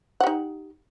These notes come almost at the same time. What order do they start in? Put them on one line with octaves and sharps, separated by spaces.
F#5 G4 D#4